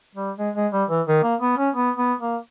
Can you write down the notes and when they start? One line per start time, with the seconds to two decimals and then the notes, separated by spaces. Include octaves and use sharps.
0.15 G3
0.38 G#3
0.55 G#3
0.72 G3
0.89 E3
1.07 D#3
1.23 A#3
1.41 B3
1.58 C#4
1.75 B3
1.98 B3
2.21 A#3